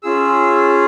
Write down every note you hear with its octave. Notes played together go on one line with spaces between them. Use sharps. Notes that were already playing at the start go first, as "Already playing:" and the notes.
C#4 F4 G#4 E6